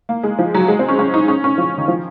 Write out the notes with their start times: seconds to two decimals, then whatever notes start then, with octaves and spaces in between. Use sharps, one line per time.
0.09 A#3
0.23 G#3
0.39 F3
0.54 F#3
0.68 G#3
0.79 C4
0.88 C#4
0.99 C#4
1.14 D#4
1.28 C#4
1.44 C#4
1.58 F3
1.78 D#3
1.88 F3